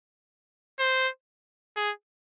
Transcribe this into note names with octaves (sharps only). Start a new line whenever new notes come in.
C5
G#4